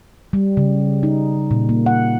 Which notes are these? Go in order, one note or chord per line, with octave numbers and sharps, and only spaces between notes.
G3
C#3
D#4
A#2
A#3
F#5